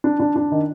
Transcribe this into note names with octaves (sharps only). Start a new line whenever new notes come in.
D4
D4
D4
D#3